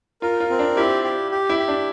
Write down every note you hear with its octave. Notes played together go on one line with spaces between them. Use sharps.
F4 A#4
F4
C4
D4
E4 G4
G4
G4
E4
G4
D4